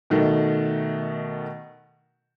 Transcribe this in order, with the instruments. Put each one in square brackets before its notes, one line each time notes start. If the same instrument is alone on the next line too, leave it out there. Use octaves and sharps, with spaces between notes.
[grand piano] B2 D#3 A3